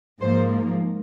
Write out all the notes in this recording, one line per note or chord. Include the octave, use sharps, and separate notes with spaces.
G#2 F3 A#3 C5